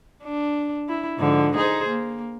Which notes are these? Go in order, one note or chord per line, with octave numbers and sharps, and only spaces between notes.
D4
E4
G#2 D3 F3
D#4 G#4 C5
A#3